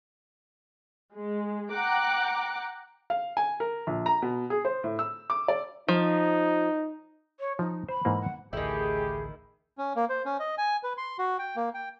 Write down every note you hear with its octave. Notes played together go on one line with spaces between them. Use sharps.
G#3
F#5 G5 A#5 D6 F#6
F5
G#5
A#4
A#1
A#5
B2
G#4
C5
A2
E6
D6
D5
F3 D#4
C#5
F3 D#4
C5 B5
G#2 E3 A#3
F#5
A1 D2 D#3 A3 E4 G4 G#4
C#4
A#3
C5
C#4
D#5
G#5
B4
C6
F#4
G5
A#3
G5